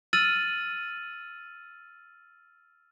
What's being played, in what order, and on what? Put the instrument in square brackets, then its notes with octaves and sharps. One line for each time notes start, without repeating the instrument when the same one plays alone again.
[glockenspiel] E6 F6 A6 D#7 F#7